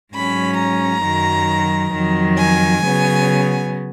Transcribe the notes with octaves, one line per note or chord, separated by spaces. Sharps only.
G#2 F#3 C#4 B5
A#5
F#2 D#3 F#3
F2 D#3 F#3
G#5
C#3 F#3 B3